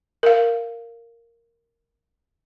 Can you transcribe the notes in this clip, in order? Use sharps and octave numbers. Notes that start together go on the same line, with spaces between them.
A#4 F5